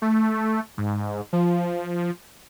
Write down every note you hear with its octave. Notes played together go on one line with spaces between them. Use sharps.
A3
G#2
F3